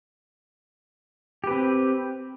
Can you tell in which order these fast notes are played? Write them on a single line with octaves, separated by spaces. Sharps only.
G4 B4 C4